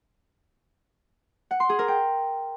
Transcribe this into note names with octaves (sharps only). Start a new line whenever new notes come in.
F#5
C6
G#4
A#4
G5